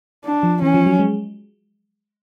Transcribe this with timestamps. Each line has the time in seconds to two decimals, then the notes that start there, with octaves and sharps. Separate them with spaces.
0.25 D4
0.43 F3
0.62 E3 C#4
0.74 F3
0.86 F#3
0.99 G#3